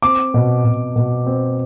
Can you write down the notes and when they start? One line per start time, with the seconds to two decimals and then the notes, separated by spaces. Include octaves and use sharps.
0.02 C4 D6
0.34 B2
0.64 B2
0.96 B2
1.26 C4